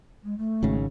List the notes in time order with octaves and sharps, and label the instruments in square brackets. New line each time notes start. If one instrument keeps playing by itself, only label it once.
[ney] G#3
A3
[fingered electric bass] G#1 G#2 C#3